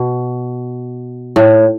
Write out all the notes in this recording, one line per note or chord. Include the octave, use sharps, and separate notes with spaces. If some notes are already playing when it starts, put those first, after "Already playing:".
Already playing: B2
A2